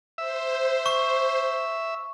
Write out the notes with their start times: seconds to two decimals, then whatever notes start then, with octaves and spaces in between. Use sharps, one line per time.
0.18 C5 E5
0.86 C#6